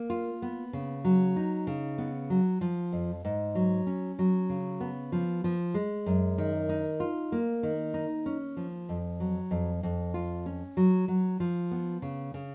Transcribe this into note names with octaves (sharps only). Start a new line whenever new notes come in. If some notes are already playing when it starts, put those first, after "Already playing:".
Already playing: A#3
F4
B3
C#3
F#3
D#4
C#3
B3
F#3
F3
F2
G#2
F#3
C#4
F#3
C#3
B3
F3
F3
G#3
F#2
D#3
D#4
F4
A#3
D#3
D#4
C#4
F3
F2
F#3
F2
F2
F4
C#4
F#3
F#3
F3
B3
C#3
C#3